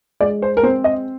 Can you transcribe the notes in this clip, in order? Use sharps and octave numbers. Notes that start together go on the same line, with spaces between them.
G#3 D5
C5
A#4
C4 C5
D#5